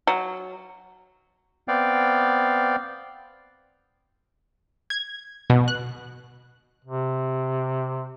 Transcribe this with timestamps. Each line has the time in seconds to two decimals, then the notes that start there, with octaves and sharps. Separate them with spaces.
0.07 F#3
1.68 B3 C4 D5 F5 G5
4.90 G#6
5.50 B2
5.68 F#6
6.85 C3